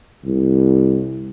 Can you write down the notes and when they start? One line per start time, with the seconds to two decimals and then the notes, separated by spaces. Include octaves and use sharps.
0.25 C2